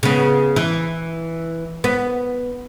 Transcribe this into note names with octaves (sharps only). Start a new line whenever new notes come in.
C#3 B3
E3
B3